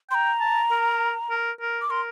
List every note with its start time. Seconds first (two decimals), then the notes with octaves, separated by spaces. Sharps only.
0.11 G5 C6
0.15 A#5
0.40 A5
0.71 A#4
1.30 A#4
1.61 A#4
1.81 D6
1.90 A#4 C6